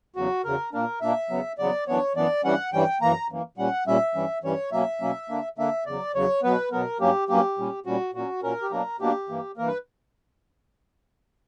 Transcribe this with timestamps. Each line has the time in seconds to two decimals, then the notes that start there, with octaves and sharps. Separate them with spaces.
0.16 E2 C#3 F#3 F#4
0.44 E2 C#3 F#3 A#4
0.73 A#2 A#3 D4 A#4
1.01 A#2 A#3 D4 E5
1.30 E2 C#3 F#3 B3
1.58 E2 C#3 F#3 B3 D5
1.87 F#2 E3 B3 D4 C#5
2.15 F#2 E3 B3 D4 D5
2.44 G2 E3 G3 C#4 F#5
2.73 G2 E3 G3 C#4 G5
3.01 F#2 E3 A#3 A#5
3.29 F#2 E3 A#3
3.58 A#2 G3 C#4 F#5
3.87 A#2 G3 C#4 E5
4.15 G2 E3 G3 C#4
4.43 G2 E3 G3 C#4 C#5
4.72 B2 F#3 A#3 C#4 E5
5.01 B2 F#3 A#3 C#4
5.30 D3 A#3 D4
5.58 D3 A#3 D4 E5
5.86 E2 C#3 F#3 D5
6.15 E2 C#3 F#3 C#5
6.43 B2 F#3 B3 B4
6.72 B2 F#3 B3 A#4
7.00 G2 F#3 A#3 C#4 G4
7.28 G2 F#3 A#3 C#4 G4
7.58 A#2 G3 C#4
7.86 A#2 G3 C#4 F#4
8.14 A#2 F#3 C#4 F#4
8.43 A#2 F#3 C#4 A#4
8.62 G4
8.71 B2 F#3 A#3 D4 A#4
9.00 B2 F#3 A#3 D4 G4
9.29 G2 E3 A#3
9.57 G2 E3 A#3 A#4
9.67 B4